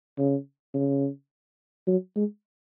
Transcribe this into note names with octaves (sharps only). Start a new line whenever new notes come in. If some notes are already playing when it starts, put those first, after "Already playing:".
C#3
C#3
F#3
G#3